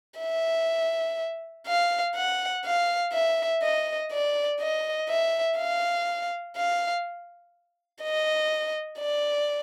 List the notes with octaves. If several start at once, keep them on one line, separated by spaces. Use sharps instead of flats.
E5
F5
F#5
F5
E5
D#5
D5
D#5
E5
F5
F5
D#5
D5